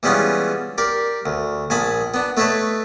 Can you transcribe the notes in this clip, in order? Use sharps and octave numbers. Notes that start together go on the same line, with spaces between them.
E3 G3 G#3 B3 C#4 F4
G4 A#4 D5
D2
A#1 G#5 A5 B5 D#6
B3 D4
A3 A4 B4 C#5 D#5 A5